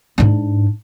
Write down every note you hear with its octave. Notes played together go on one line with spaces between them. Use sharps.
G#2 D4